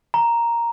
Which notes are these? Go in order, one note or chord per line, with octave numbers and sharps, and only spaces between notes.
A#5